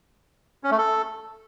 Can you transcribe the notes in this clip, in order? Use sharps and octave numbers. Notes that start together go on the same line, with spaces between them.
C#4
A3
A4